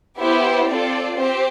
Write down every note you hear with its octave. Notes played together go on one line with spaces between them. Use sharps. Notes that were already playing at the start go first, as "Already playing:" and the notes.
B3 E4 G4 C5
C4 F4 A4 D5
C4 G4 C5